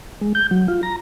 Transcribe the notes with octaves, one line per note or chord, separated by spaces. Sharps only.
G#3
G6
F#3
F4
A#5